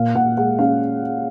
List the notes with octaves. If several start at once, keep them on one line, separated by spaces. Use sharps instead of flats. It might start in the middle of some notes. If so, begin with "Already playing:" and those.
Already playing: A#2 F5
A#2 F#5
G#3 F#5
C#4 F5